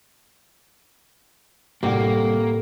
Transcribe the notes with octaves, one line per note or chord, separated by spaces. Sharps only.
C2 A2 A#3 G4 F#5